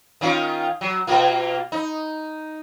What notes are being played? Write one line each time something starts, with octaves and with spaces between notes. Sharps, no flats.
D#3 C#4 F4
F#3
B2 A#3 F4
D#4